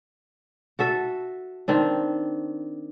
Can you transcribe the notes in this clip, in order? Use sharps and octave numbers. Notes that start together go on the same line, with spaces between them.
F#4 A4 E5
D#3 C4 D4